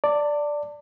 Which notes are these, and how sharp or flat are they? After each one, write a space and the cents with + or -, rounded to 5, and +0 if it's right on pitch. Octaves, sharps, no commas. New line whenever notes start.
D5 +0 A5 +35